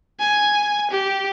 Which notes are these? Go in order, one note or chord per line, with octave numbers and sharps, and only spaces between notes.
G#5
G4